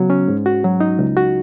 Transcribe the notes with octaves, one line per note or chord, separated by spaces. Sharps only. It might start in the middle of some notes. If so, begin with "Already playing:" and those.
Already playing: C#3 F#3 B3 F#4
C#4
G#2
F#4
F#3
D#4
C#2
F#4